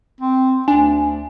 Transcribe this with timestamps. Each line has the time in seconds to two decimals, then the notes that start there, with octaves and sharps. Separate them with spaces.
0.21 C4
0.68 D2 D4 G#5